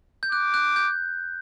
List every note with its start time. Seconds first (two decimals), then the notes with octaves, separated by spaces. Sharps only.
0.23 G6
0.32 D6 F#6
0.54 F#6
0.76 G6